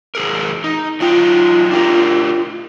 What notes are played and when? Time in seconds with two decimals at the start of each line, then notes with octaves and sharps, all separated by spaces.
0.15 E2 G#4 A#4
0.64 D#4
1.00 F#3 D#4 F4 G5
1.71 D4 G4 A#4